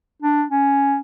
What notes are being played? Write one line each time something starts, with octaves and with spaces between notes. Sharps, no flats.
D4
C#4